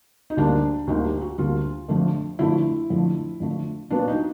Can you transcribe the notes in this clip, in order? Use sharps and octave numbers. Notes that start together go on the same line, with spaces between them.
D#4
D2 D3 G3 A#3 D4
D2 D3 G3 A#3 D#4
G4
F#4
D2 D3 G3 A#3 F4
F2 D3 F3 A3
F2 D3 F3 A3 E4
F2 D3 F3 A3
F2 D3 F3 A3
A#2 F#3 B3 D4
D#4